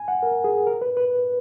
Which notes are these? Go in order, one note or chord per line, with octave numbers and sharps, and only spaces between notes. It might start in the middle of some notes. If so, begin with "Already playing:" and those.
Already playing: G#5
F#5
A#4
G#4
A#4
B4
B4